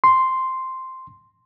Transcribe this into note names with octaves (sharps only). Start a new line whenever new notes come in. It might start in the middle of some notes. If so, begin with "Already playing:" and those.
C6